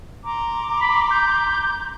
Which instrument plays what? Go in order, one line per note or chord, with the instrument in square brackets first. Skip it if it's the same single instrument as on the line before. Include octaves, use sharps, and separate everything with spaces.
[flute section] A#5 C6 D6
[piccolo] B5
G6